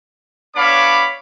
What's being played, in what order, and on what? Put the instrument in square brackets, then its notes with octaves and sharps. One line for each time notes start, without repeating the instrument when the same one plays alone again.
[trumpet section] B3 D4 C#5 F5 B5 D6